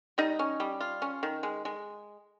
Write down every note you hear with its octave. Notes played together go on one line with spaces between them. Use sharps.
G3 D#4 D#5
C#4
G3
F4
C#4
D#3
G#3
G#3